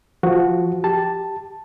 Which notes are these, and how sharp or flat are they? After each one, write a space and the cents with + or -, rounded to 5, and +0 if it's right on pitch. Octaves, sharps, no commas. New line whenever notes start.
F3 -5 F#4 +0
G4 +0 A5 +0